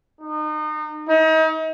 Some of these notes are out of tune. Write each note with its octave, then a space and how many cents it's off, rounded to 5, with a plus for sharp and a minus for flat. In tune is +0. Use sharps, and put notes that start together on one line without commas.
D#4 -30
D#4 +35